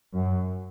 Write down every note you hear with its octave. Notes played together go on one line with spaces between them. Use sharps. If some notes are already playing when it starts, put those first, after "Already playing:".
F#2